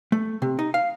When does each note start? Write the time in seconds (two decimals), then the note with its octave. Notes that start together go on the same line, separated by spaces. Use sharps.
0.12 A3
0.42 C3
0.59 D#4
0.74 F5